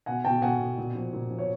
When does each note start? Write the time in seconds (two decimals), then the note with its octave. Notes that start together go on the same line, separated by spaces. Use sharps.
0.06 B2 F#5 G#5
0.25 B2 G5 A5
0.42 B2 F#5 G#5
0.59 B2
0.78 A#2
0.95 F3
1.13 A#2
1.31 F3
1.38 C#5